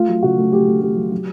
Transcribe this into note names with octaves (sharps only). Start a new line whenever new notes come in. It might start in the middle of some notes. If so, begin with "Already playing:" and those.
Already playing: A3 F4
F#3
C#3 F#4
A3
A3 G4
A3
A3 G4
F#3
F#3